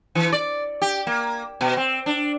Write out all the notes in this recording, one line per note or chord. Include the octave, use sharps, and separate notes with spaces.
E3
D5
G4
A#3
B2
C4
D4